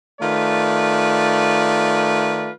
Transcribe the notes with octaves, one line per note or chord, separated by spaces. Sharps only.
D#3 A3 F4 B4 D5